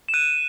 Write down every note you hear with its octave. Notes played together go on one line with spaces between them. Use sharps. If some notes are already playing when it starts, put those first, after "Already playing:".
E7
F#6 D#7